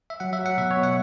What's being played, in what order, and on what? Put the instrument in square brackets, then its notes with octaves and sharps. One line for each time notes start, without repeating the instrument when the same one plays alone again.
[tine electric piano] E5
F#3 F#5
E5
F#3
F#5
B2 E5
C#5
B2
F#5